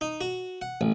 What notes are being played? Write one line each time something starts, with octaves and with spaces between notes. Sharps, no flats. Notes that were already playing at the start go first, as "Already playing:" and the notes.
D#4
F#4
F#5
A1